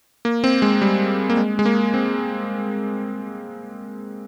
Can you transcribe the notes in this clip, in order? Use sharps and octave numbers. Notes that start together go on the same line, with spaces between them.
A#3
C4
G#3
G3
A#3
G#3
G#3
A#3
C4